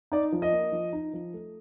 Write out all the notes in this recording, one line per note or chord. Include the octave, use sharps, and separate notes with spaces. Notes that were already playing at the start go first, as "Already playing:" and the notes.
D#4 D5
F3
D#5
A#3
F3
D#4
F3
A3